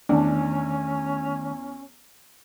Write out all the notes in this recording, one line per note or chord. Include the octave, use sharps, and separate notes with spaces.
E2 D#3 A3 C#4 D4